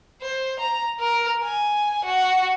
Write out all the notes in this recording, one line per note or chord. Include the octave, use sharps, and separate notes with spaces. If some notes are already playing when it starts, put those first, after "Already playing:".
C5
A#5
A#4
G#5
F#4